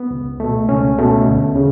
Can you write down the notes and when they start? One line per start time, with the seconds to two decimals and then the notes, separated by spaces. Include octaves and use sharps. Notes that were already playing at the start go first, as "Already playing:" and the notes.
Already playing: B3
0.11 C#2
0.40 B2 A3
0.69 C#2 C#4
0.98 B2 A3
1.27 D2
1.56 C#3